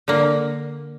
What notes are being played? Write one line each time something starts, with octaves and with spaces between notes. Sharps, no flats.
D3 A#3